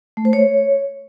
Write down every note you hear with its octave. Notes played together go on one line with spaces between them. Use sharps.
A3
C5
C#5